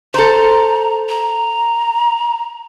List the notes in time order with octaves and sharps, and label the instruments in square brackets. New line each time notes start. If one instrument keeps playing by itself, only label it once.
[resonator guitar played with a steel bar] A4 C5 [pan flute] A#5
[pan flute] A#5